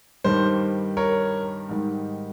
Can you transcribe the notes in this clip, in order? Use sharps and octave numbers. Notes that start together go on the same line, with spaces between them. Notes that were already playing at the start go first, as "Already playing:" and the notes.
G2 D#3 G3 C5
A#4 C#5
G#2 D#3 G3